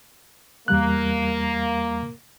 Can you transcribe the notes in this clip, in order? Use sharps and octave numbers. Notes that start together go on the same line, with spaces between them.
E2 G3 A#3 F#6